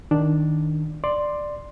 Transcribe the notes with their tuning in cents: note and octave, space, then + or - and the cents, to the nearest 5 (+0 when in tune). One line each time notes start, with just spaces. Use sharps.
D#3 +0 D4 +0
D5 +10 C6 +0